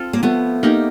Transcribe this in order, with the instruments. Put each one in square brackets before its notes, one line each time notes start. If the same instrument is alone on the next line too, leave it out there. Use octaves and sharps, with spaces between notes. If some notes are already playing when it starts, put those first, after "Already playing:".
Already playing: [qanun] C4 F4 A4
[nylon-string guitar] A#3
[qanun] F3 [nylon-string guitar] A3 B3
[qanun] A#3 D#4 G4